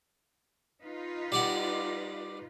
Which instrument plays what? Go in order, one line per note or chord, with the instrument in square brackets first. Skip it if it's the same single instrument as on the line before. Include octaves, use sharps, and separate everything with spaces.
[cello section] D#4 F4 B4
[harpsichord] G3 D5 F#5